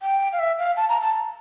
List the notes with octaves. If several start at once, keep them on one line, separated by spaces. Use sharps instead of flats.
G5
F5
E5
F5
A5
A#5
A5